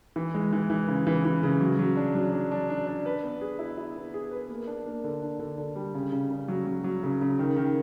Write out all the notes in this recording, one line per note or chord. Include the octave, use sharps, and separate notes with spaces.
E3
G#3
E3
E3
C#3
E3
E3
C#3
F#3
F#3
D4
F#3
D4
D4
D4
D4
B4
B3
G#4
E4
E4
B3
G#4
B4
A#3
D4
A#3
D3
D4
D3
D3
G3
C#3
C#3
C#3
F#3
F#3
F#3
C#3
C#3
D#3
D#3